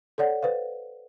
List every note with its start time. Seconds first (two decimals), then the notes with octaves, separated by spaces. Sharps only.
0.18 A4 C#5 D5 F#5
0.43 B4 C5 F5